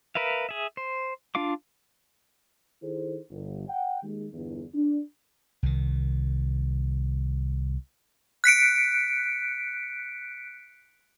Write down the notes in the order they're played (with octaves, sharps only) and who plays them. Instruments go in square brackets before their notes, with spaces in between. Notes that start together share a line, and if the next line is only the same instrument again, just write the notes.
[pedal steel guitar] A#4 B4 E5 F5
G#4 E5
C5
D4 F4 F5 D6
[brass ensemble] D#3 E4 G#4 A4 C5
G1
F#5 G5
D#2 G#3
G1 E2
D4
[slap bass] C2 D#3
[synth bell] F#6 B6 C#7 D7